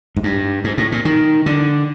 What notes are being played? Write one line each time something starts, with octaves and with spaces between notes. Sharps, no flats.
G#2
G2
G#2
A2
A#2
D#3
D3